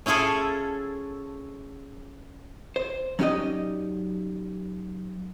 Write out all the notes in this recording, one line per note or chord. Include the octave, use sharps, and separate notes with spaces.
C#4 E4 F4 G#4 A4
C5
F#3 C#4 D#4 G4 D5 D#5